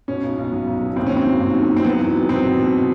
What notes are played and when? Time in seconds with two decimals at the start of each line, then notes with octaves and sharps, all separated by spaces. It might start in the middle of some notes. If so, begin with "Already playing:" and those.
0.08 B2 C#4
0.23 B1
0.38 B1
0.52 F#3
0.67 B1
0.81 B2
0.96 D#2 C4
1.07 C#4
1.12 D#2 C4
1.26 F#3
1.41 D#2
1.55 D#3
1.70 D#3
1.76 C4
1.85 F#3 B3
2.00 E2
2.14 F#3
2.29 B2 C4
2.44 B2
2.58 B2